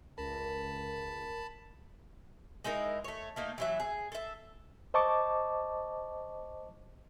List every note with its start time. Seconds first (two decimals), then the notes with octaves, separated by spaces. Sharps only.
0.18 C#2 A#4 A5 B5
2.64 G#3 D#4 E4 A#4
3.04 A3 C#5
3.36 A3 A#3 D#4
3.58 E3 F#3 E5
3.80 G#4
4.12 A4 E5
4.94 C5 D#5 A5 C#6 D6